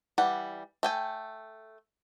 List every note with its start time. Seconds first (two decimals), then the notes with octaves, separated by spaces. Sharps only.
0.18 E3 G3 F#5
0.83 A3 G5 G#5